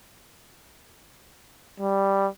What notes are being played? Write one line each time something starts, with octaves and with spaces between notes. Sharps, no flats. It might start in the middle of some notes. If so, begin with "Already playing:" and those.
G3